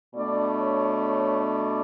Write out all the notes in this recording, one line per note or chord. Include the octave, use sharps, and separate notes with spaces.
B2 A3 D4 D5
C#5
C#5
D5